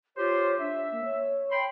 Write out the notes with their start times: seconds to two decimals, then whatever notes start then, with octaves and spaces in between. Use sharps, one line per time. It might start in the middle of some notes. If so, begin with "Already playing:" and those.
0.17 F4 G4 C5 C#5
0.60 D4 E5
0.92 A#3
1.05 C#5
1.51 G5 B5 C6